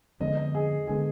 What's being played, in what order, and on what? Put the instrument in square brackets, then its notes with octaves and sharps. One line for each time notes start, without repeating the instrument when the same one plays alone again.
[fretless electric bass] F2 D3 G#3 B3 [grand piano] D#5
[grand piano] D#5
G#4
[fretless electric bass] D3 G#3 B3 [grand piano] G#4